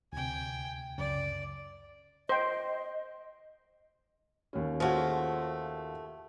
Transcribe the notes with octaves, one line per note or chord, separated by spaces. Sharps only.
D2 C3 G5 G#5
C#2 F#2 C#3 D5
C5 D#5 G5
D#2 C#4
F3 A3 F4 F#4 G#4